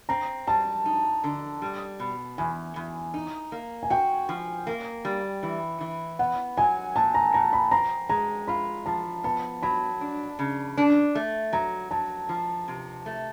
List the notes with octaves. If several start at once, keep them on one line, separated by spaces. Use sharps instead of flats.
C4 A#5
G3 A5
D#4
D3
G3
B2
E2 G#5
E2
D#4
A#3
G#5
F#4 G5
F3
A#3
G3
E3
E3
B3 F#5
F#3 G#5
A#2 A5
A#5
A#2 A#5
B5
C4 A#5
G#3 A#5
F4 B5
F3 A5
B3 A5
F#3 B5
D4
C#3
D4
A3
F#3 A#5
F#3 A5
F3
C3
A3